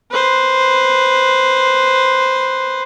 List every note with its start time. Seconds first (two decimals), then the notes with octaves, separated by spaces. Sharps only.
0.11 B4 C5